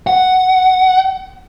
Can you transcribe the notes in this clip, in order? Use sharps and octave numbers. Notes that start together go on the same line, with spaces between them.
F#5